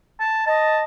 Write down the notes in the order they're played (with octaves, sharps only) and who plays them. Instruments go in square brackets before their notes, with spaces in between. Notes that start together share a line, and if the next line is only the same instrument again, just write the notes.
[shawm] A5
[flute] D#5 [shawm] A5